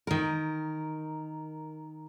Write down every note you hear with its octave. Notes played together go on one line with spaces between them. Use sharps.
D#3 A#4